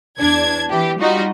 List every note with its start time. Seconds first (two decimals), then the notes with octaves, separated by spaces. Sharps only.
0.17 E2 D4 G#6
0.70 E3 G4
0.99 G3 D#4 F4 F#4 D#5